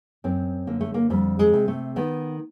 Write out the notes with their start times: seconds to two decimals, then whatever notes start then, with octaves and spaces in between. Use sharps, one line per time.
0.24 F#2 C4
0.67 D3 A#3
0.81 A3
0.94 A#3
1.10 F2 G3
1.39 G#3
1.53 C3
1.68 A3
1.96 D#3 B3